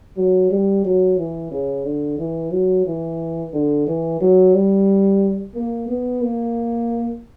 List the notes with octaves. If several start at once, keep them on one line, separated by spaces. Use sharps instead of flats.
F#3
G3
F#3
E3
C#3
D3
E3
F#3
E3
D3
E3
F#3
G3
A#3
B3
A#3